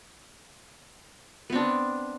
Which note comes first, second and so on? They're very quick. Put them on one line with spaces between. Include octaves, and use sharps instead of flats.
B3 C4 D4